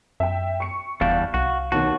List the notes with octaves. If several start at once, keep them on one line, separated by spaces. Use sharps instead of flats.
F#2 E5 G5
C#6 C#7
F#1 E2 G3 D4 F5
C2 F#4
D#2 B2 D#3 F#4 A5